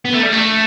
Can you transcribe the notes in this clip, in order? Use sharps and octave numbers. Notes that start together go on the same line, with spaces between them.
B3
A3
G3
A3